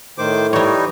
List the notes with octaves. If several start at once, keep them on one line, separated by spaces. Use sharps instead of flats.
A2 D#3 C5 D6
E3 G3 D#4 C#5